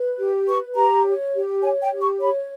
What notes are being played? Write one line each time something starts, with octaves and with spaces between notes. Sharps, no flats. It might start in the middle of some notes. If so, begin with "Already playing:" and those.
Already playing: B4
G4
B4 C#6
G4 A#5
C#5
G4
C#5 G#5
G5
G4
C#6
C#5 B5